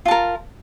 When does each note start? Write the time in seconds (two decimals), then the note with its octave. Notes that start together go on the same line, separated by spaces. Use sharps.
0.05 F4
0.08 A5
0.11 A#4